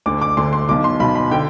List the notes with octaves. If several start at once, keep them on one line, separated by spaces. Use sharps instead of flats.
D2 D3 D6
D6
D2 D3 C6
C6
B1 B2 D6
C6
B1 B2 B5
B5
D3 G5